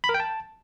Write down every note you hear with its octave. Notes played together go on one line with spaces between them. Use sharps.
B5
A#4
G5
A5